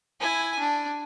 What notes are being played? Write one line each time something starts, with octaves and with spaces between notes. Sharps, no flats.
E4 G#5
D4